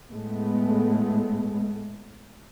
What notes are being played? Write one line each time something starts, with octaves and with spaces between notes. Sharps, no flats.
A2 G#3 A3 B3